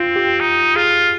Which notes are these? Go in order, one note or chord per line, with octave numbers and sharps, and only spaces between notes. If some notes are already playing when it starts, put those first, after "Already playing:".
Already playing: C4 F4
G4
D#4
F4 G#4